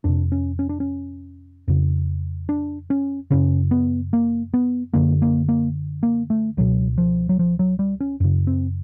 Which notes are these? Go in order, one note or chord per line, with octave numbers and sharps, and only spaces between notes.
F2 C3 D4
C#4
C#4
D4
C#4
F2 C#3
D4
C#4
F#2 C#3 C#4
B3
A#3
B3
F#2 D3 A#3
A#3
A#3
A#3
A3
C#2 B2 F#3
F3
F#3
F3
F#3
G3
C#4
F#2 C#3
C4